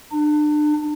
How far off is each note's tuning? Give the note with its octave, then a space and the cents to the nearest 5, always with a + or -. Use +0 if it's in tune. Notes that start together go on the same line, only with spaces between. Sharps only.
D4 +35